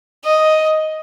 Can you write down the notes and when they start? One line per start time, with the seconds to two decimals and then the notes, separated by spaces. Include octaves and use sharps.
0.24 D#5